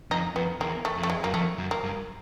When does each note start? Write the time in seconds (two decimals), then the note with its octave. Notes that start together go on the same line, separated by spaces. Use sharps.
0.11 F2 D#4
0.36 F2 B3
0.60 E2 A#3
0.85 A3
0.98 F2
1.03 A3
1.10 G#3
1.23 F#2 A#3
1.34 F2 A3
1.58 F#2
1.71 A#3
1.84 G2